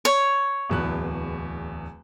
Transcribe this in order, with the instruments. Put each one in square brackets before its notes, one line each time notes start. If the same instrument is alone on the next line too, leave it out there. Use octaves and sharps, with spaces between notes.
[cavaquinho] C#5
[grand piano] D1 E2 F#6